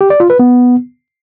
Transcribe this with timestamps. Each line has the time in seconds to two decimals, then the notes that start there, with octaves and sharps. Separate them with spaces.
0.01 G4
0.10 D5
0.20 F4
0.30 B4
0.39 B3